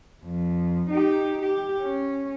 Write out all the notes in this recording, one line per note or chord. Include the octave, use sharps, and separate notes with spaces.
F2
D#4 G4
G4
C#4